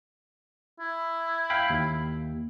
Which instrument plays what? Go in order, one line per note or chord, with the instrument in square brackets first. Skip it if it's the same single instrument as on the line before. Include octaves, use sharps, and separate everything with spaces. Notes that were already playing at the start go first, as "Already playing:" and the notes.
[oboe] E4
[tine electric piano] F5 G5 B5
D#2